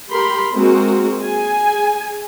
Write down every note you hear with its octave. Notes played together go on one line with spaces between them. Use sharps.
G4 A#4 B5 C6
G#3 A#3 C4 F#4 A#4
G#4 G#5